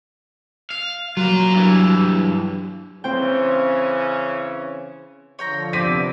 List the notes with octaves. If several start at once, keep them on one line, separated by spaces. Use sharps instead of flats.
F5
F#3 F4 A#4
G2 E3
C#3 E3 C4 C#4 C5 G5
D3 F3 C#5 G5 A#5
C3 B3 C4 D5 G5 B6 D#7